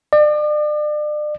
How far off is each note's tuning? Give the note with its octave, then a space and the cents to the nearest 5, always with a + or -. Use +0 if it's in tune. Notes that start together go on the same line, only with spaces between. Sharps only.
D5 +35